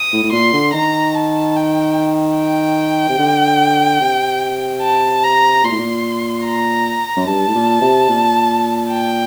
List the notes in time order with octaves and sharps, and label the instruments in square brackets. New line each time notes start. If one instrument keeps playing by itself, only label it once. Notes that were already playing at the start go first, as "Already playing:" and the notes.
Already playing: [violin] D#6
[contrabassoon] A2
A2
[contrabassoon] A#2 [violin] C6
[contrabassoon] D3
[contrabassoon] D#3 [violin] A#5
[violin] A5
G5
G5
[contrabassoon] C3
D3
C3
[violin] A5
A#5
[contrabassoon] A#2 [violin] C6
[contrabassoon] A2
A#2
[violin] A#5
[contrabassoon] F#2
[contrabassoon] G2 [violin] A5
[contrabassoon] A2
A#2
C3
A#2
[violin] G5